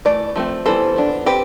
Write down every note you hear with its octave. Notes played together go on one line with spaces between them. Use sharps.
E3 A3 D5
F3 A3 C4
E3 G3 B3 A4 C5
F3 B3 D4
C4 G4 B4